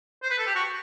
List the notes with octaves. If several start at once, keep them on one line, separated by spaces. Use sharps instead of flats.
C5
B4
A4
G4
F#4